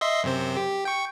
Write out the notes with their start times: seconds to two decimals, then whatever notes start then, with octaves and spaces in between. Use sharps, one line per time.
0.01 D#5 E5 C6
0.24 F#2 C3 C5
0.57 G4
0.85 G5 C#6